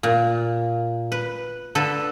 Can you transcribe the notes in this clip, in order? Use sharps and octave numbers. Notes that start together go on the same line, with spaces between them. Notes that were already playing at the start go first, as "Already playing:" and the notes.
A#2
B4
D3 A4 B4